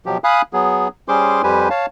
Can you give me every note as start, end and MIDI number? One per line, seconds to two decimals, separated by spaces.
0.06 0.18 47
0.06 0.18 53
0.06 0.18 54
0.06 0.18 67
0.24 0.42 77
0.24 0.42 80
0.24 0.42 83
0.24 0.42 87
0.24 0.42 90
0.53 0.88 54
0.53 0.88 59
0.53 0.88 68
1.08 1.42 55
1.08 1.42 61
1.08 1.42 68
1.08 1.42 72
1.08 1.42 84
1.08 1.42 86
1.43 1.69 41
1.43 1.69 55
1.43 1.69 67
1.43 1.69 71
1.43 1.69 72
1.43 1.69 80
1.70 1.86 73
1.70 1.86 77
1.70 1.86 81